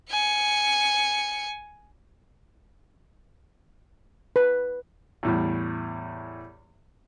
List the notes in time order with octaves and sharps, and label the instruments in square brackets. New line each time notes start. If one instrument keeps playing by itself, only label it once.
[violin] G#5 C#7
[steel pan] B4
[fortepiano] E2 A2 G3